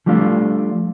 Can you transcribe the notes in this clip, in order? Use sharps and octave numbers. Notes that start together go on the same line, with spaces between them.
F3 G3 A3 D4 F4